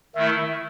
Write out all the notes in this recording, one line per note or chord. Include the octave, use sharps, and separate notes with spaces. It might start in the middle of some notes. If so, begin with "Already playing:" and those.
D#3 A3 E4 E5